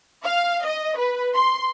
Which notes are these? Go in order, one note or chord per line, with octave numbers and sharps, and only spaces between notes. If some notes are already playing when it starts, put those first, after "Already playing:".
F5
D#5
B4
C6